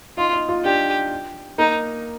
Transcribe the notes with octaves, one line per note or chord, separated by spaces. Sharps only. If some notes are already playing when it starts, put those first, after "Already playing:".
D#4 F4
D#4
F4
D4 G4
A#3 D#4